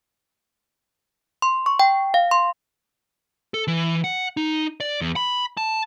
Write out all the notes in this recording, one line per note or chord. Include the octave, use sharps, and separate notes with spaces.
C6
C#6
G5
F5
C6
A4
E3
F#5
D#4
D5
E2
B5
A5